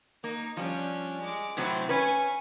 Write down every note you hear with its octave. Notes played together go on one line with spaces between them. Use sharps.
A#3 D#4
F3 G3 C#4 D4
G#3 D6
A2 C3 F#3 C4 E4
C#4 B4 G#5 C#6